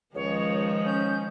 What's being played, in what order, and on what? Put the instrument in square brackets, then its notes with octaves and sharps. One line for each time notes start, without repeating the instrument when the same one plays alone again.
[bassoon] C#2 [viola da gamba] D#3 F3 G#3 [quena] C#5
[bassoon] C#4 [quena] G6